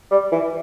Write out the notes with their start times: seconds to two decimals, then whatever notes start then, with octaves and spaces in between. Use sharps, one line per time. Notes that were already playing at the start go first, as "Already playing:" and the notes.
0.11 G3
0.32 E3